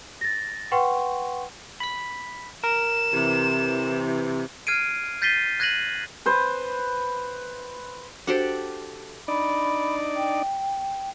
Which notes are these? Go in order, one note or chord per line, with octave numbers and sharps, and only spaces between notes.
A6 A#6
B4 F#5 G5 C6 C#6
B5 B6
A#4 E7
C3 E3
F6 G#6 C7 D7 D#7
G6 A6 B6 C7 D#7 G7
F#6 G#6 A#6 D#7 F#7
B4 C5
D4 F#4 G4 A4 C5 F#5
D4 D#4 D5 B5
G5